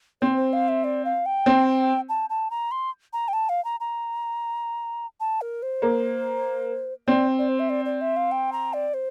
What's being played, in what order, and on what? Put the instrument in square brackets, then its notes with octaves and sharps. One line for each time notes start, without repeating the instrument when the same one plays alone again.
[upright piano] C4 [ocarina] C5
[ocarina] C5
F5
E5
D5
F5
G5
[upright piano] C4
[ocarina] A5
A5
A#5
C6
A#5
G5
A5
F5
A#5
A#5
A5
A#4
C5
[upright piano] A#3
[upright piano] C4 [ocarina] D5
[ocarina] D5
C5
E5
D5
D5
E5
F5
G5
A#5
D5
C5